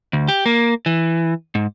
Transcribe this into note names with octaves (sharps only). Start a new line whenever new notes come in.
D2
G4
A#3
E3
G#2